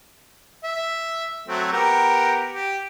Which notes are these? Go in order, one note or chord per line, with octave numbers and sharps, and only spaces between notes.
E5
F#3 A3 C4
B3 G4 A#4
G4